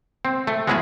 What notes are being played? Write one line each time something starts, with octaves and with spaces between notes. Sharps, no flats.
C4
A3
G#3 B3 C#4 E4 F#4 G#4